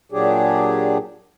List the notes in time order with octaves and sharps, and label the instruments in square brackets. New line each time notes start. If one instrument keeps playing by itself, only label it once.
[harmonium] A#2 F#3 D4 G4 G#4